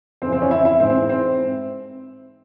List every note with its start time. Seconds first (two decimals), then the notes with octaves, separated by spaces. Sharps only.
0.22 F2 C#3 E3 C4
0.32 C4
0.42 C#4
0.51 E4
0.65 E4
0.79 G#2 E3 C4
0.90 C4
1.09 C4